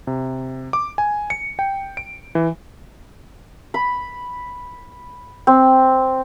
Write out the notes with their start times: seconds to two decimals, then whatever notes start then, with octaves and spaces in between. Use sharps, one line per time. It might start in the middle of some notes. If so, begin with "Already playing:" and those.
0.07 C3
0.73 D6
0.98 G#5
1.30 C#7
1.59 G5
1.97 D7
2.35 E3
3.74 B5
5.47 C4